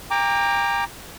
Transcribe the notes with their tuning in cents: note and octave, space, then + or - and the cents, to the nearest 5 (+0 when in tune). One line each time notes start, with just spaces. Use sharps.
G5 +35 A#5 +0 D6 +0